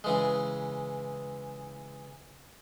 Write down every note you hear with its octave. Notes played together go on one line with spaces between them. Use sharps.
C#3 E3 G#3